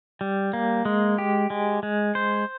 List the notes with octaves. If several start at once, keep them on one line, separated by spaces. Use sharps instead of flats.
G3
A#3
G#3
G4
G#3
G#3
C5